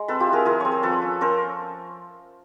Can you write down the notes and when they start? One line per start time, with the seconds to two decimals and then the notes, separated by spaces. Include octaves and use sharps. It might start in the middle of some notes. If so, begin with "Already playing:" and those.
Already playing: G#3
0.08 C4 A4 B4
0.20 F4 G4
0.27 E4
0.33 G#4 A#4
0.45 F3 G#4 A#4
0.60 C4 C#5
0.72 C5
0.83 F3 A4 B4
1.02 C#4
1.21 C#4 A#4 C5